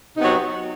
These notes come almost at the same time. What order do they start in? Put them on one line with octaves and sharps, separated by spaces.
C3 D#4 B3 F#3